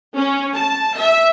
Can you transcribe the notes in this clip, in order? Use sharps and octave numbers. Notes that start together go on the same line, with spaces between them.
C#4
A5
E5